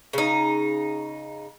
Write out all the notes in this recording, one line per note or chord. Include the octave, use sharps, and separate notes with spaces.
C#3 D#4